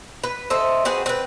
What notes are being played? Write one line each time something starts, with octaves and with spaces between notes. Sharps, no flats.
B4
A4 C5 D#5 E5
C4 F#4 G#4 B4
C4 B4